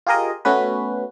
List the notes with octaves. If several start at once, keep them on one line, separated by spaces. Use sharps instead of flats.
F4 G4 G#4 A#4 D#5
A3 B3 C#4 F#4 B4